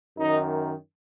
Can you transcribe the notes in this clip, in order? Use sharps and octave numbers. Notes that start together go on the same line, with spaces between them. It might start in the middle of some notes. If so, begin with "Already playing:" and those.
F#2 D#3 D#4